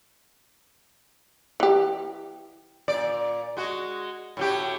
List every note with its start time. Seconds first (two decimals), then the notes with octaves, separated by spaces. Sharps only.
1.60 E3 G4
2.88 A#2 D5
3.57 G#3 F#4
4.37 A2 F#3 G4